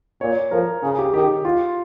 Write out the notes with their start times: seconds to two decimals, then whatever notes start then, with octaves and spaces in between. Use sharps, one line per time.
0.21 A#2 C#5
0.51 F3 A#4
0.82 C#3 G#4
0.98 G4
1.14 D#3 G4
1.45 F4